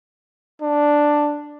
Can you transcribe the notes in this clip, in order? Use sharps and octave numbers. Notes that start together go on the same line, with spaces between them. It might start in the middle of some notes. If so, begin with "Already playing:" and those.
D4